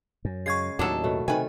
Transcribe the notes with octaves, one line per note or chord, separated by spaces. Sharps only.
F#2
C#3 G#3 C#6 G#6 C7
D#2 A2 F#3 D4 D#4 A4
B2 A3
C3 D#3 A3 B4 G5 G#5